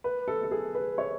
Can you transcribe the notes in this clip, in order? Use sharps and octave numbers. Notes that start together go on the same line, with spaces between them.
B4
A4
A4
G#4
B4
C#5